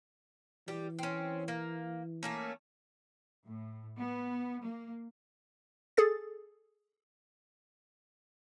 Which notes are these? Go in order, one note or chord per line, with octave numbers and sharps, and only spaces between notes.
E3 G3 G4
C4 C#4
A#3
A3 A#3 C#4
A2
B3
A#3
G#4 A4 A6